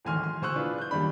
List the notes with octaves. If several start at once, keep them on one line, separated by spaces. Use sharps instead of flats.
D1 G#1 E2 G#5 C6 F6
C6
D2 C5 G#5 C#6 E6 F#6
D4 E4 F4 G#4 B4
F#6 G6
F#1 D#2 G3 D4 B5